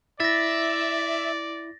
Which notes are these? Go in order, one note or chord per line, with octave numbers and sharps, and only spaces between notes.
E4 D5 E5 A6 A#6